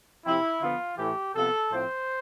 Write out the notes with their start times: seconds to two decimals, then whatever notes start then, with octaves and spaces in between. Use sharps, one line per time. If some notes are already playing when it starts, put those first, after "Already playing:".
0.24 C3 F3 C4 E4
0.61 D3 F3 B3 F4
0.98 A2 E3 A3 G4
1.35 C3 F3 B3 A4
1.71 A2 F3 C4 C5